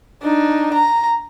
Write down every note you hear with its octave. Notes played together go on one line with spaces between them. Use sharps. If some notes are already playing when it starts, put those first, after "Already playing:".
D4 D#4
A#5